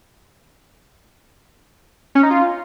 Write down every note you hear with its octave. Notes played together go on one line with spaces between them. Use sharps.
C#4
D#4
F4